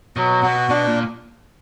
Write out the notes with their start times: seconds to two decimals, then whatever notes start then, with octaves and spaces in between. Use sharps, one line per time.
0.16 B2 F#3
0.43 B2 F#4
0.69 B2 D4
0.86 A#2